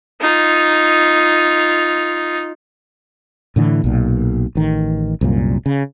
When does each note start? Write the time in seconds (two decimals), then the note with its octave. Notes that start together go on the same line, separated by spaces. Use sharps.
0.21 D#4 F4
3.56 A2 D3 E3
3.84 B1 A#2
4.55 A1 D#3
5.21 C2 F#2 A#2
5.66 C#3